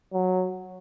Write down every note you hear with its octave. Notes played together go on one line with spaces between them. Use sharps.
F#3